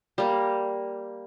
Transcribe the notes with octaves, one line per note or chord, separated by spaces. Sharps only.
G3 A#3